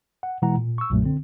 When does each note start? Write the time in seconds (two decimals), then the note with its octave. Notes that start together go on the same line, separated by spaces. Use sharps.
0.23 F#5
0.42 B2 E3 G#3 E4 F#5 A#5
0.57 A#2
0.78 C#6 E6
0.90 B1 F#2 A#2 F#3 A3
1.04 D3 C4